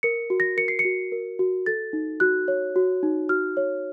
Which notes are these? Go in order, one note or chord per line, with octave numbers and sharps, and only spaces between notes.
A#4 C#7
F#4
A#6
A#4 C#7
C7
C#7
F#4
A#4
F#4
A4 A6
D#4
F#4 F#6
C#5
F#4
D#4
F#4 F6
C#5